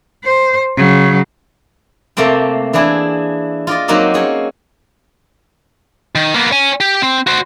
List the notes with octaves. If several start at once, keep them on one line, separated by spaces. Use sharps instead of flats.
C5
C#3 F#3
C3 A3 A#3 C4 G5
E3 D4 E4 G#4
F4 D5 D#5
F#3 A#3 C4 D#4 F#4 G4
C4 C#4 G#4
D#3
A#3 B3
C#5 G#5
G4
C4
F#4 C5